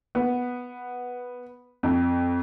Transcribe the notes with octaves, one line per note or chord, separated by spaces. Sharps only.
B3
F2